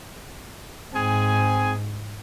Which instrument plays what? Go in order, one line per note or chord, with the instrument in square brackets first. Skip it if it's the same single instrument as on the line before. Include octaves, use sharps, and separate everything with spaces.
[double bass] G#2 [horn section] C4 G#4 G#5